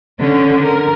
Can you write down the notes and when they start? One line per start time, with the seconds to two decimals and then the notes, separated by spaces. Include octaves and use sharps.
0.19 D3 C#4
0.63 A#4